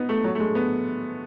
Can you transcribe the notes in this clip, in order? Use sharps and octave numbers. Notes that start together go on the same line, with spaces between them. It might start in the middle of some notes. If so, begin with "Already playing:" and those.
Already playing: B3 D#4
A3
F#3
A3
G#3
B3